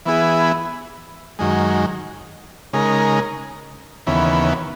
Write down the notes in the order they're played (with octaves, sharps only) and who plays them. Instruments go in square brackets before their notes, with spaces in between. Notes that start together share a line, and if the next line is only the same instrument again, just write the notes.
[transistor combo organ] E3 B3 E4 G#4
F#2 D#3 G#3
C#3 G#3 D#4 A#4
D#2 C#3 E3 B3